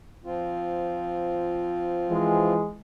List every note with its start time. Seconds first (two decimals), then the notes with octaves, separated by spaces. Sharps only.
0.25 F3 C4 F4
2.10 E3 G#3